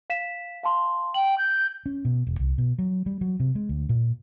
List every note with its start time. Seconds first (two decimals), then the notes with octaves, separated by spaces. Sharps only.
0.10 F5 B6 E7
0.63 F5 A5 C6
1.14 G5 F#7
1.38 G6
1.86 C#4
2.05 B2
2.27 E1
2.40 C2
2.58 B2
2.79 F#3
3.06 G3
3.21 F#3
3.40 C3
3.55 G#3
3.69 D2
3.89 A#2